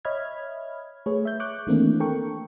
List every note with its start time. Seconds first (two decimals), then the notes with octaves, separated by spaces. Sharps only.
0.05 C#5 D#5 E5 B5 F6 G#6
1.06 A3 G#4 B4 C#5
1.25 E5 G6
1.40 C#6 D6 F#6 G6
1.67 D#3 E3 A3 A#3 C4 D4
2.00 A4 A#4 G5 C#6